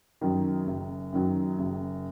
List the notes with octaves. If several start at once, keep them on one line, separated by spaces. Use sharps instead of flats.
F#2 D#3 F#3
F#1
F#2 D#3 F#3
F#1